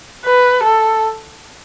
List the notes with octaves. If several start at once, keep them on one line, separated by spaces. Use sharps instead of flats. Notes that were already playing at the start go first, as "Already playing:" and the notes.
B4
A4